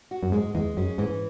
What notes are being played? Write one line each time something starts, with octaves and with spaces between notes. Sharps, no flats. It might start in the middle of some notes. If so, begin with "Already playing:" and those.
F#4
F#2
G#2 G#3
E2 G#3
F#2 C#4
G#2 E3